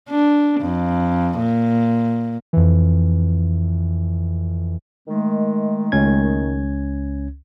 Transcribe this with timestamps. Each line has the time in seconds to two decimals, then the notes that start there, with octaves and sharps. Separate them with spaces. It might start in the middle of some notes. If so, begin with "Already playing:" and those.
0.10 D4
0.61 F2
1.38 A#2
2.53 F2 E3
5.07 D#3 G#3 A3
5.92 C#2 C#4 G#6